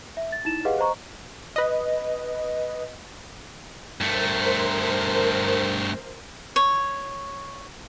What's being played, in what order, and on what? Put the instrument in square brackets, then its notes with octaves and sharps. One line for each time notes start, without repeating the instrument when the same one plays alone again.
[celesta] E5
A6
D#4 E4 A6 E7
G4 G#4 B4 D#5 F5 F#5
C5 D#5 A#5 C#6
[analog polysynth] B4 D#5
[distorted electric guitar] G2 A3 [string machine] A#4 C5
[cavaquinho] C#5